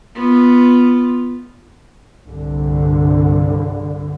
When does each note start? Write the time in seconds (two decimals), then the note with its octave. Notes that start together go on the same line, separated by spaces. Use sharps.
0.15 B3 F4
2.25 C2 G2 D3